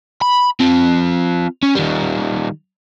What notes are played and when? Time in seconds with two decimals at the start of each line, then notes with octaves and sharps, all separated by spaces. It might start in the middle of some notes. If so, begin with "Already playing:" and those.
0.22 B5
0.60 C4 F4
1.63 C#4
1.75 D#3 G3